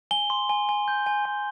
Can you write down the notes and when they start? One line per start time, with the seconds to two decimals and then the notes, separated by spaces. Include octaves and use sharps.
0.11 G#5 G7
0.30 C6
0.50 G#5
0.69 G#5
0.88 G6
1.06 G#5
1.25 G#5